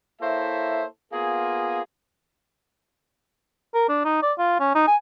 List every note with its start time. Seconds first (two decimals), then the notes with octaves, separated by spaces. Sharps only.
0.21 A#3 E4 A4 C5 C#5 E5
1.13 A#3 B3 F4 G#4
3.74 A#4
3.89 D4
4.05 D#4
4.22 D5
4.39 F4
4.60 C#4
4.75 D#4
4.87 G#5